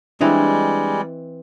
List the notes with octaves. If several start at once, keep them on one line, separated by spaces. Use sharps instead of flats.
E3 G3 G#3 C4 D4 D#5